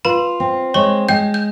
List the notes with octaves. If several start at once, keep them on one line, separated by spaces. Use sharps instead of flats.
F4 B4 B5
C4
G#3 C#5 C#6
G#3 G5 G6
G6